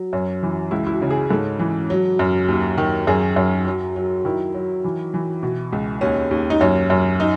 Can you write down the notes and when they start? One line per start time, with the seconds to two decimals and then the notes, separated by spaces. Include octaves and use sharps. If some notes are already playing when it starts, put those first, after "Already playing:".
Already playing: F#3
0.13 F#2 C#4
0.43 E3
0.71 C#2 E4
0.87 E4
0.92 F#4
1.02 C#3
1.10 G#4
1.31 G#2 A4
1.59 E3
1.90 F#3
2.19 F#2
2.48 D#2
2.78 D#3
3.07 F#2 G#4
3.36 F#2
3.67 F#3
3.96 F#3
4.25 D#3 E4
4.54 F#3
4.84 E3
5.14 E3
5.43 B2
5.73 C#2
6.01 D#2 C#4
6.31 D#2
6.50 D#4
6.61 F#2 C#4
6.90 F#2
7.20 D#4